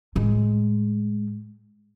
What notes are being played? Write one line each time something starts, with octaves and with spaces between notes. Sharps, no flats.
A2 G#3